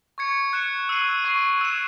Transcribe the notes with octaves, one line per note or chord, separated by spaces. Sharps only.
C#6 G#6 C#7
F#6 C#7 E7
E6 C7 D#7 F#7
C#6 E6 G#6 C7
E6 G#6 C#7 E7